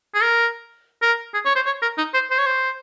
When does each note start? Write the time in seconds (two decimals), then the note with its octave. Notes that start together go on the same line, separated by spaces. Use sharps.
0.15 G#4
0.22 A#4
1.02 A#4
1.34 G#4
1.45 C#5
1.55 C5
1.66 C#5
1.82 A#4
1.98 D#4
2.14 C5
2.31 C5
2.39 C#5
2.46 C5